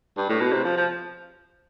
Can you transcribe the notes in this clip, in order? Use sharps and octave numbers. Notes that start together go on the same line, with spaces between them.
G2
A2
B2
C3
F3
F3